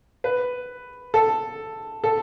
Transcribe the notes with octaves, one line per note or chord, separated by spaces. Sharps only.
B4
A4
A4